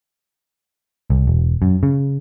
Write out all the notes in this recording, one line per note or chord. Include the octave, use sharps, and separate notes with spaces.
C2
E1
F#2
C#3